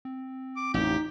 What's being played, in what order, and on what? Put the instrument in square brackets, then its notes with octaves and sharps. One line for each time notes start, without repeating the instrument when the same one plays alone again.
[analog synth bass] C4
[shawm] D6
[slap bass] A1 F2 [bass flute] D#4 [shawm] G4